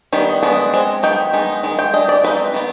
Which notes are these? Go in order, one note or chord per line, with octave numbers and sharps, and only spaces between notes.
D#3 G3 B3
G#3 B3 D4
G#3 C4
D#3 B3 D#4 G5
G#3 B3 D#4
D#3 G#3
G5
G#3 D4 D#5
D5
G#3 C4 D#4 B4
D#3 B3